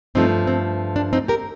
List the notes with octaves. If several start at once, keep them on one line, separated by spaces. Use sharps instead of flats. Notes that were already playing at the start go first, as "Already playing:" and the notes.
G2 F3 A3 C4 D#4
C4
D4
C4 D#4
G4 A#4